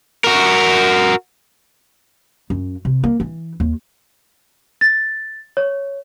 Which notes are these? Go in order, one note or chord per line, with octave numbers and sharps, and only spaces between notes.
F#4 A#4
F#2
C3
A#3
E3
D#2
A6
C#5